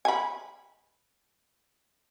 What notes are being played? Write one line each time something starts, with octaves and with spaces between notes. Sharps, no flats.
G#5 B5